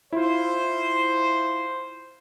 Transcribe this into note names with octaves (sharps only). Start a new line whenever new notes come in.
E4 F4 C5